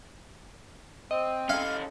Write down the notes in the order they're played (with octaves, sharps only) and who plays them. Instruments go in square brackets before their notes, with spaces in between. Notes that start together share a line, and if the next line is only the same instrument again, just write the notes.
[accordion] C4 [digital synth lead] D#5
[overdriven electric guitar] C#4 A4 [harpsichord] F5